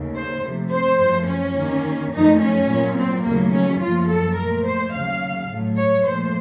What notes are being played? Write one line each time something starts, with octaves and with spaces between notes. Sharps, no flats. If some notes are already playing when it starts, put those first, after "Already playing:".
Already playing: D#2 C#3 A3
C5
C3 F3 A3
C5
F#2 F3 A3
C#4
D#2 D#3 A#3
F#2 F3 A3 D#4
C#4
A#2 F#3 A#3
C4
D#2 C#3 F#3 A3 A#3
C#4
F#2 F3 A#3 F4
A4
A#2 A3 A#4
C5
D#2 C#3 F#3 F5
A2 F#3 A3
C#5
A#2 F3 A3 C5